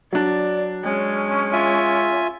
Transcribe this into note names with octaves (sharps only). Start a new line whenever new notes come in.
F#3 D4 D5
G#3 C#4
F4 E5 G#5